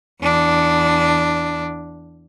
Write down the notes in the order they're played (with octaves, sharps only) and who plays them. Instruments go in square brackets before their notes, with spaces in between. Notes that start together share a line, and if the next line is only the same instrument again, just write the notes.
[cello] E2 D4